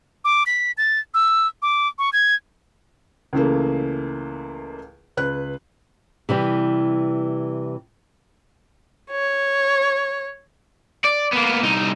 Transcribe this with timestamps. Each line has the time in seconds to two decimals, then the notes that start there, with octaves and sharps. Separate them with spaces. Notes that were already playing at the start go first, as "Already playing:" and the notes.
0.25 D6
0.46 B6
0.78 A6
1.14 E6
1.62 D6
1.99 C#6
2.13 G#6
3.33 C#2 C#3 E3 A3 A#3
5.17 C#2 B4 F#6
6.29 C3 E3 G3
9.11 C#5
11.04 D5
11.32 A#3 B3
11.62 C2 D#4